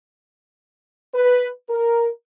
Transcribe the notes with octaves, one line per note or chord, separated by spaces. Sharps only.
B4
A#4